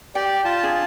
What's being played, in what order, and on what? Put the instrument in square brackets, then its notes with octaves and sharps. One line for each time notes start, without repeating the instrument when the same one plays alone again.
[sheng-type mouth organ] G4 D5 [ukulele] G5
[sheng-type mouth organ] F4 A5
[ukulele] D4 G#4